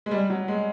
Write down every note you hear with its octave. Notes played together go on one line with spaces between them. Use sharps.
G#3
G3
F#3
G#3